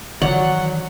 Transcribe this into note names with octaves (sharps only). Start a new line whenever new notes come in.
D#3 E3 F#3 C#5 D5 F#5